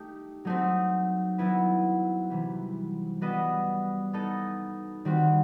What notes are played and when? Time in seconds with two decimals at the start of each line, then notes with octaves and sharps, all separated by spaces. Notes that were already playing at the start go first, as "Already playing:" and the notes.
Already playing: A3 D#4 G4
0.45 F#3 A3 C4 D#4
1.38 F#3 B3 E4 B4
2.30 C3 E3 G3
3.21 G3 B3 F#4 B4 D#5
4.13 B3 D#4 A4 D#5
5.05 D#3 G3 C4 F#4